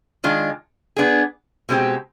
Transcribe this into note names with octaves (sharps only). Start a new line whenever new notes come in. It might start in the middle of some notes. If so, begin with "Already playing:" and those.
D#3 G#3 D4 F4
B3 D4 G#4
B2 G#3 C4 G4